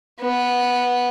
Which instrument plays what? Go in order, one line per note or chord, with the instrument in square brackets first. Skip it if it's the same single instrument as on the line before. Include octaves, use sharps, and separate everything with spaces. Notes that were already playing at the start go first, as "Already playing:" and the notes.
[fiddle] B3